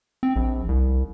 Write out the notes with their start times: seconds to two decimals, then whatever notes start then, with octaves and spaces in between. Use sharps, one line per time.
0.23 C4
0.36 A#1
0.68 C2